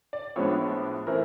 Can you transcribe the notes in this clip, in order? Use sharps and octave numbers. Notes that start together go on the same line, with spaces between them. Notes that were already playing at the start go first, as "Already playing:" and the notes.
D5
A2 F3 G#3 B3 D4 C#5
E3 A3 C4 A#4